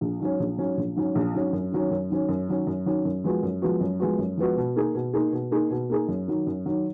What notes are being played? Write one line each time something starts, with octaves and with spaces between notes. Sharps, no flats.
A#1
G#2 F#3 C#4
A#1
G#2 F#3 C#4
A#1
G#2 F#3 C#4
A#1
G#2 F#3 C#4
F#2
D#3 F#3 C#4
F#2
D#3 F#3 C#4
F#2
D#3 F#3 C#4
F#2
D#3 F#3 C#4
F#2
F3 G#3 B3 F#4
F#2
F3 G#3 B3 F#4
F#2
F3 G#3 B3 F#4
F#2
F3 G#3 B3 F#4
B2
A#3 D#4 G#4
B2
A#3 D#4 G#4
B2
A#3 D#4 G#4
B2
A#3 D#4 G#4
F#2
D#3 F#3
F#2
D#3 F#3